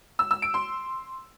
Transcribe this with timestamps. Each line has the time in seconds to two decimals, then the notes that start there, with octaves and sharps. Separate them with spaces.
0.19 E6
0.31 E6
0.42 D7
0.54 C6